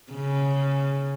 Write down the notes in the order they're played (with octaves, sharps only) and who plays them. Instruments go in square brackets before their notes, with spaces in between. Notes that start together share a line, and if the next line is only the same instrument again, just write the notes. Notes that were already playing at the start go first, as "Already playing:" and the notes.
[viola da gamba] C#3